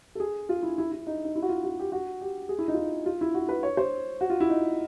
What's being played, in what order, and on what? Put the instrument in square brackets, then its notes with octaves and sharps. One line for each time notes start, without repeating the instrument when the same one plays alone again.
[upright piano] A4
G#4
F4
E4
E4
E4
D#4
D#4
E4
F#4
F4
F#4
G4
F#4
G4
G#4
E4
D#4
F4
E4
F4
E4
F#4
B4
C#5
C5
F#4
F4
E4
D#4